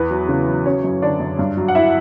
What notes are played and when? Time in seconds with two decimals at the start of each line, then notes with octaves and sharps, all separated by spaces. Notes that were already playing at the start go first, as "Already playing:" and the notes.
Already playing: E2 B3 B4
0.11 F#3
0.29 C#3
0.48 F#3
0.65 F#3 C#4 C#5
0.84 F#2
1.02 D3 D4 D5
1.20 F#2
1.39 G2
1.57 F#3
1.68 F#5
1.75 E4 E5